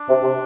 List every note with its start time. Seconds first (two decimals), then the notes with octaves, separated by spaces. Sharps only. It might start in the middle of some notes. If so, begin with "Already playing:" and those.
Already playing: D4
0.08 C3
0.23 C3